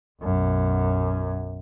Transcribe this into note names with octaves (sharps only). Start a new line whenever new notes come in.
B1 F#2